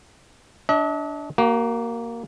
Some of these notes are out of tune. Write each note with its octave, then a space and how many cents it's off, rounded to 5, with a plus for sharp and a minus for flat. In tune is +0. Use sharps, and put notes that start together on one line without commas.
D4 -10 D#5 +45
A#3 +0 F#4 +40